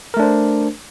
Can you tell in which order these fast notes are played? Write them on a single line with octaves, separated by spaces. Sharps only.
A#4 A3 D4 C5